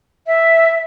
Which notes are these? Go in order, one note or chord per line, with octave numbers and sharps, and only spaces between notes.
E5